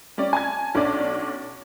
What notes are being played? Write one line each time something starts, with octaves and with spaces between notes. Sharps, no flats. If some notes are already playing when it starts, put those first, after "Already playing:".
G3 C#4 D5
G#5 A5 G#6
B1 C#4 D4 D5